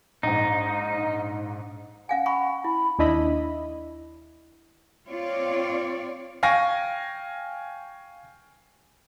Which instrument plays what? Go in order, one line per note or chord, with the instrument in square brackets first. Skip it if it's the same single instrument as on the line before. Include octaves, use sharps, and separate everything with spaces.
[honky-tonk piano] A#1 G#2 [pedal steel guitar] D#4
[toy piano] C#4 F5 G#5 [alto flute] F#5
[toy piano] G#5 B5 C#6
[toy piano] E4 [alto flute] B5
[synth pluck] D#2 D4 E4 D#5 B5
[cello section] C4 F4 C#5 D5
[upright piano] F5 G5 G#5 C#6 A#6